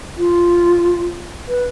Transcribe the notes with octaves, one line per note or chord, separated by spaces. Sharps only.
F4
B4